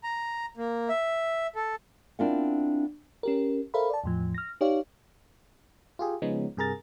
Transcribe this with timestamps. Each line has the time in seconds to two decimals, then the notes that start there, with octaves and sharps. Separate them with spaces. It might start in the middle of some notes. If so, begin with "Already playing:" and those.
0.03 A#5
0.57 A#3
0.89 E5
1.55 A4
2.19 C4 D4 E4 F4 A#4 F#5
3.23 C#4 G4 A#4
3.74 A4 A#4 C5 E5 F5 B5
3.90 D5 A5
4.04 E2 A2 F3
4.34 F6 A#6
4.61 D#4 G4 C#5 D5 F5
5.99 F4 G4 G#4
6.22 C#3 F3 G#3 B3 C#4 D#4
6.57 G2 C3 G#4 A#4 A#5 A6